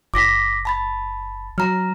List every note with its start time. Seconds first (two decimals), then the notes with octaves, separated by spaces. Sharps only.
0.14 F#1 D6 A#6 B6
0.65 A5 B5 A6
1.58 F#3 A#5 F6